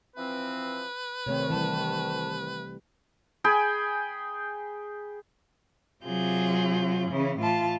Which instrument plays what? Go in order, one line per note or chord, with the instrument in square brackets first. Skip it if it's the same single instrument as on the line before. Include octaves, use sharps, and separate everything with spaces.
[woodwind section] E3 F3 C4 [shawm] B4
[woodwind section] C2 D#3 [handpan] C3 A3 C4 [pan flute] C#5
[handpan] E3 G3 [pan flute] A5
[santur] G#4 G5 G#5 B5
[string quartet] C3 F#3 F4 G#4 G6
C#3 E3 C#4
A2 E3 F4 A5